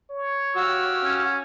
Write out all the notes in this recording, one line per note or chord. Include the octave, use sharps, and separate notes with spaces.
C#5
F#4 G4 F5 E6
C#4